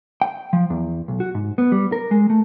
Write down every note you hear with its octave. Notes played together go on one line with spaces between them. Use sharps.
G5
F3
E2
B1
F#4
G#2
B3
G3
A#4
G#3
A3